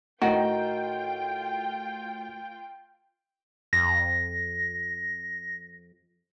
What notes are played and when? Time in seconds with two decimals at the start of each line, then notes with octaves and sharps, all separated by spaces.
0.22 A2 D#3 F4 F#4 G5
3.73 F2 A#6